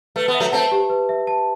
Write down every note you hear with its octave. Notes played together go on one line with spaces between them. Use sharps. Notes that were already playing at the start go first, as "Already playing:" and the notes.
A3 B4
B3
E5
F#3 A3
A3 C4 A5
G4
B4
E5
A5